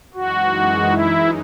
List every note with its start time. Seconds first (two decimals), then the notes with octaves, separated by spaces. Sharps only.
0.14 F#2 E3 G#3 D#4 F#4
0.90 E4